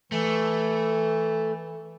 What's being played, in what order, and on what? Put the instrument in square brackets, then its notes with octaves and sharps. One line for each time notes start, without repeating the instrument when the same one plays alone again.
[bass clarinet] E3 [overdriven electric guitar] A3